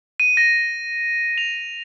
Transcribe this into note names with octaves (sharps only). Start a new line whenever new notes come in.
D#7
A#6
F7